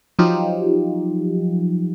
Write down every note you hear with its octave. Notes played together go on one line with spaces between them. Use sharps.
F3 F#3 D#4 F4 G4